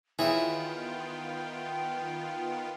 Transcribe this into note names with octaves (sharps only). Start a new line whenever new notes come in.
D#3 E3 B3 F4 G#4 C#5 E5 G5